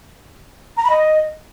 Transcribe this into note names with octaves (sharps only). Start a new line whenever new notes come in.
A#5
B5
D#5